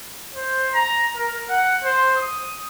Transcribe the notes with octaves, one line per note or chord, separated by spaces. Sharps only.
C5
A#5
A#4
F#5
C5
D#6